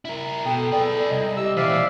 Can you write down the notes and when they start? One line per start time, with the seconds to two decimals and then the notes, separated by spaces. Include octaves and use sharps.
0.05 E4 A#4
0.46 B2 A4 G5
0.72 G#4 B4 D5
1.10 C2 D#5
1.37 G4 E6
1.57 A#2 E3 C5 D5 E5 F5